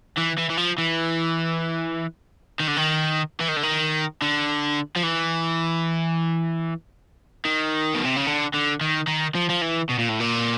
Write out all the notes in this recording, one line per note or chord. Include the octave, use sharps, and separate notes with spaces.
E3
E3
E3
F3
E3
D#3
D3
D#3
E3
D#3
D3
D#3
D3
F3
E3
D#3
B2
C3
C#3
D3
D3
D#3
D#3
F3
F3
E3
B2
A#2
A2
A#2